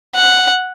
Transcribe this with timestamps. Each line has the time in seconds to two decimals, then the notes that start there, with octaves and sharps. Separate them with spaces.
0.15 F#5